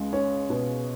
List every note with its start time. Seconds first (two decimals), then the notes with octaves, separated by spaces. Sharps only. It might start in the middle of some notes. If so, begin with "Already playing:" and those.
Already playing: C#2 G#3
0.13 C#4
0.50 B2